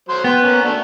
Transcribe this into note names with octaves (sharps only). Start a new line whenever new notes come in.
F#3 C5 C6
B3 G5
A#3 C#4
A3 D4 F#4